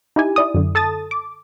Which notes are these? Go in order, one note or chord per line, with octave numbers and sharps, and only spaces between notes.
D#4 E4 G4 G#5
E4 D5 D#6
F#2 D3
A4 A5 D#6 A6
D6